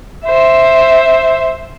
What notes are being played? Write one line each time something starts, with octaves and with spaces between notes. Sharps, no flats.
C5 E5